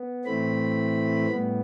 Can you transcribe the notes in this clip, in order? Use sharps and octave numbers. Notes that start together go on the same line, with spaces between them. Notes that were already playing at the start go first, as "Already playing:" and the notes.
Already playing: B3
A2 E3 A3 C4 B5
A2 G3 B3